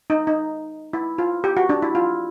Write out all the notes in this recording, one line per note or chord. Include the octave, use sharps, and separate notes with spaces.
D#4
D#4
E4
F4
G4
F#4
D4
E4
F4